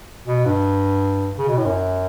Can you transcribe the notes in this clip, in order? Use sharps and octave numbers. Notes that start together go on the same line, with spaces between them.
B2
G2
C#3
B2
A2
F#2